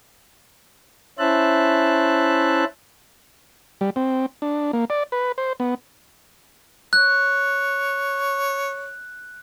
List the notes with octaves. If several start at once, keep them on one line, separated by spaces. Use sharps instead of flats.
C#4 E4 C5 E5 A5 F#6
G3
C4
D4
A#3
D5
B4
C5
B3
C#5 F#6